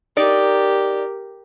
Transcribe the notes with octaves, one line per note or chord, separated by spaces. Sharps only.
D#4 G4 A#4 D5